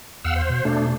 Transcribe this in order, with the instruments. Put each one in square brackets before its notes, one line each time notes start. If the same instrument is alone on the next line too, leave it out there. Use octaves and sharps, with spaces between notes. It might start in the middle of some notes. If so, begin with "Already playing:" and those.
[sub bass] E2 [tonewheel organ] F5 F#5 E6
[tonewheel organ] C5
[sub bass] B2
[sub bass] B2 [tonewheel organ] A3 D4